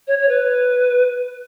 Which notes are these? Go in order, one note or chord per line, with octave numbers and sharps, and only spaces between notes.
C#5
C#5
B4